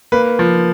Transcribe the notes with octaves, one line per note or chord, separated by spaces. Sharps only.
A#3 B4
F3